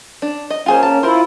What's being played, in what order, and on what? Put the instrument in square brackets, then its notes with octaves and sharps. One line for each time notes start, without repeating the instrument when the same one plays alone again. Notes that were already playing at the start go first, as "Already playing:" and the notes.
[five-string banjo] D4
D#5
[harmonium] A#3 C#4 [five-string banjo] F4 G#4 C5
[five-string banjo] A5
[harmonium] E4 F4 [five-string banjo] A#4 C5